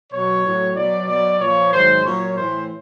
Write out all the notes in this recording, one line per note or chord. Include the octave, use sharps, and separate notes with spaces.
B2 F#3 C#5
A2 F#3
B2 F#3 D5
B2 F#3 D5
A#2 F3 C#5
G#2 D#3 F#3 C5
A#2 F#3 C#5
A2 E3 C5